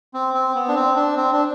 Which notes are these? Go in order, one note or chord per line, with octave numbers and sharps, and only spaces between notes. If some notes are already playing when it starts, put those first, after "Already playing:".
C4
C4
B3
D4
C4
D4
C4
D4